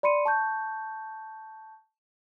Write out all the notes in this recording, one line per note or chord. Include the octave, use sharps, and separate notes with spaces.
D5 B5 C6 C#7 D#7
A5 C#6 G6